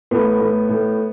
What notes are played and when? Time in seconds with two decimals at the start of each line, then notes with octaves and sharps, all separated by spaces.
0.11 A2 B3
0.41 A2
0.69 A2